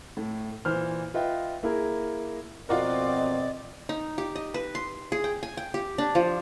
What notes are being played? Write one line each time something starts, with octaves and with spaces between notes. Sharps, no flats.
A2 A3
A#2 E3 C5 F6
F4 B4 D#5 E5 G5
A#3 E4 G#4 A#4
F2 B2 C4 F4 F#4 A#4 D5 D#5
D#4
G4
D#5
B4
C6
G#4
G5
G#5
G5
G4
D4
F3